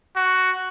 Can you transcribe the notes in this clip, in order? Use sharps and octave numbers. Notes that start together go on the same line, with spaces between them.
F#4